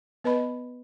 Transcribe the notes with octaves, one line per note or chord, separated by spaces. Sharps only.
B3 B4 D#5 B5